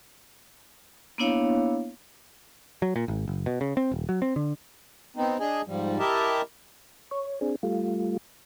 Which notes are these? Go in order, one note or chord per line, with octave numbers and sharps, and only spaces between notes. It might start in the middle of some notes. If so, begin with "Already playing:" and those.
A#3 B3 D4 E4 C#5 F5
F#3
A#2
G#1
F#1
B2
C#3
C4
D#1
F#3
C4
D3
B3 C4 D#4
D4 G#4 D#5 G#5
G#2 F3 G3
E4 G4 A#4 D#5 E5 A5
C#5
C4 D4 G#4
G3 A3 F4